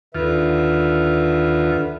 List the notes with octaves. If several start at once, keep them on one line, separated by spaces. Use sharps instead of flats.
D#2 D3 F4 B4 E5